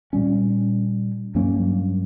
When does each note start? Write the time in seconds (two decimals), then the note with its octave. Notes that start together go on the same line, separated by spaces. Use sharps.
0.13 A#2 G3 C#4
1.35 G2 F#3 A#3 C#4